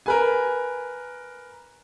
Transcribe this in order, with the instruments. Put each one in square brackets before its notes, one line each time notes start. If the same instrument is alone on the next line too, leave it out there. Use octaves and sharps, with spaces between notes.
[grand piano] A#4 B4 G#5